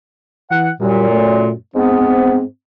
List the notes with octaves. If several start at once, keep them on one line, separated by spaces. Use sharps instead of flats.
E3 F#5
F#2 A#2 G3
A3
G#2 B3 C4